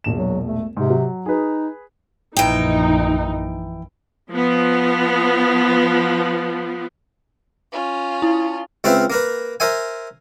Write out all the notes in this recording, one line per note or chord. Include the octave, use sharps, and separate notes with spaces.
E1 A#1 E7
F#3
A3
G#2 C3
F#3
D#4 G#4 B4
A#1 F#2 E3 D#4 G5
F3 B3
C#4 F4
E4
C#2 C4 F4 B4 C5 E5
A#3 A#4 B4
A#4 C5 E5 G#5